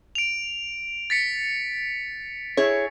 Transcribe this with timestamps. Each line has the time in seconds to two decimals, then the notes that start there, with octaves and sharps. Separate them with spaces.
0.15 D7 F7
1.10 A6 B6 C#7
2.57 E4 G#4 C#5